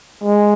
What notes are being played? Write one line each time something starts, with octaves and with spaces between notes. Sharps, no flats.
G#3